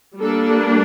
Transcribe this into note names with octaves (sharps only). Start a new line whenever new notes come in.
G3 A#3 D4 A4